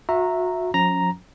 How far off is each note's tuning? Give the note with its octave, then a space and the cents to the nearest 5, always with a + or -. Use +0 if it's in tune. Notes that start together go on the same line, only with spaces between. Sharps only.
F#4 -30 E5 +0 A#5 -10
F3 +45 C#4 +0 A#5 +0